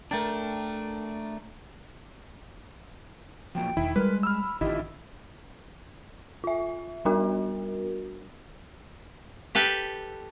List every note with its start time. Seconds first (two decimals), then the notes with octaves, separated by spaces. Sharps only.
0.11 A3 D4 A#4 G5 A5
3.55 F3 F#3 A#3 G5
3.77 E1 D#3 E4
3.96 G3 G#3 A#4 B4
4.23 B5 E6 F6
4.61 G#1 D3 D#3 E4 F4 G4 D#5 E5
6.44 F4 E5
7.05 G3 B3 D4 F#4 A#4
9.55 G4 A4 B4 G5